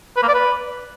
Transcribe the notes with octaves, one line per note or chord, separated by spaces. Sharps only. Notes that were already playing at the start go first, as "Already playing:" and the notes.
B4
A#3
D5
B4